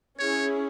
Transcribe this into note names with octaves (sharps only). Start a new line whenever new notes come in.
C#4 E4 G#4 C#5